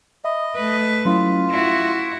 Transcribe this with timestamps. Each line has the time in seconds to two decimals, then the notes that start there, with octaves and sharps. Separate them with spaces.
0.24 D#5 E5 B5
0.56 A3 B4
1.05 F#3 C#4 E4 F4
1.50 E4 F#4 A#6